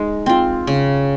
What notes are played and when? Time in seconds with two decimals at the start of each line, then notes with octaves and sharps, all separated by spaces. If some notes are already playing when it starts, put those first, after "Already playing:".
Already playing: G#3 D#4
0.26 C4 F4
0.67 C#3